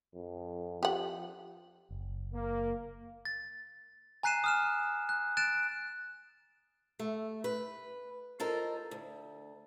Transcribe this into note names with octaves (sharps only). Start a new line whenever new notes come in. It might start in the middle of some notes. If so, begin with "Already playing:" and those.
F2
F3 G4 F#5
F#1
A#3
A6
G#5 A#5 F#6 C7 D#7 E7
D#6 F6 E7
F#6
F#6 A6 D7 E7
A3
B4
F4 A4 A#4 C5 D#5
D2